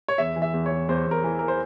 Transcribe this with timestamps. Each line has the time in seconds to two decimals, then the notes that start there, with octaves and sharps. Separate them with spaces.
0.08 C#5
0.18 E2 E5
0.36 E3
0.42 E5
0.53 E2
0.66 C#5
0.72 E2
0.89 E2 C5
1.06 E2
1.11 A#4
1.24 E3
1.39 A#4
1.48 C5